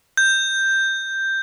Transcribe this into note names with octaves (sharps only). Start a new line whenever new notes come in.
G6